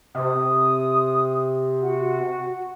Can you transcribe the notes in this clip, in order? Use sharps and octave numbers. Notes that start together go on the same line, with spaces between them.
C3 D#6
F#4 F#5